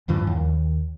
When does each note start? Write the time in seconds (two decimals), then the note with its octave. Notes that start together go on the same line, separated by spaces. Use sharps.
0.08 E2 G2 E3 F3
0.27 D#2